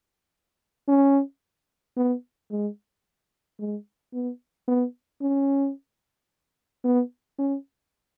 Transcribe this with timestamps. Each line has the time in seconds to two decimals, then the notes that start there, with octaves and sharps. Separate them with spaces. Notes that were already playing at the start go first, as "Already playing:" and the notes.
0.88 C#4
1.97 B3
2.51 G#3
3.59 G#3
4.13 B3
4.68 B3
5.21 C#4
6.84 B3
7.39 C#4